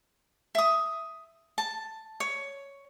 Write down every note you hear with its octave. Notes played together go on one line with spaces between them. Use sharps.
E5 D#6
A5
C#5